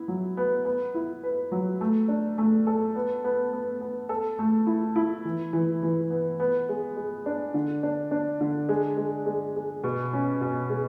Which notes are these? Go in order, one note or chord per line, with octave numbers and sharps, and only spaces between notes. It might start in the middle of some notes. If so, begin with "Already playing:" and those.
Already playing: B3 E4
F#3
B3
B3
E4
B4
F#3
A3
D4
A3
A4
B3
B3
B3
B3
A4
A3
E4
E4
E3
E3
E3
B3
B3
G#3
G#3
D4
D3
D4
D4
D3
G#3
G#3
G#3
G#3
B2
C#4
B2
G#3